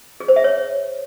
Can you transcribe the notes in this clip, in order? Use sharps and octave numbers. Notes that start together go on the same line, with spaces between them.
G#4
C5
E5
C#5